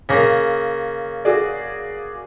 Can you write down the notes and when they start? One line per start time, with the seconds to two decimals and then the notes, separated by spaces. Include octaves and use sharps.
0.09 C#3 A#3
1.25 F#4 G#4 D5